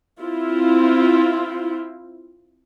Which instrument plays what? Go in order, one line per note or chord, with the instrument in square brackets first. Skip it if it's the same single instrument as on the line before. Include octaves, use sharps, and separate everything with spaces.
[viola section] C4 E4 F4